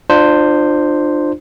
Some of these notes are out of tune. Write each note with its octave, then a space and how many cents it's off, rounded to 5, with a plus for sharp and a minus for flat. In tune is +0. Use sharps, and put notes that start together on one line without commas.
D4 +30 F4 +0 C5 +0